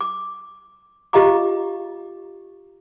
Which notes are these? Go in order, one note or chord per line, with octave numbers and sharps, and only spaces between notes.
D6
F4 G4 D#5 F5 A#5 D6